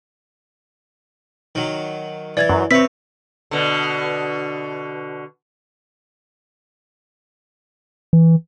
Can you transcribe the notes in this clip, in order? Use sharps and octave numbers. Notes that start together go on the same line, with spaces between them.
D#3 F#3
E3 D5 G#6 A6
F#2
C4 B4 C#5 E5 E6 B6
B2 D3
E3